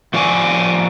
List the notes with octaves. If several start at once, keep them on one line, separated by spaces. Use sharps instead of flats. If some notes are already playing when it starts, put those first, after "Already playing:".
F3 F#4 D5 F5 G#5